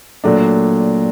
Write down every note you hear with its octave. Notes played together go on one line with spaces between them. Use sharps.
A#2 F#3 A3 D4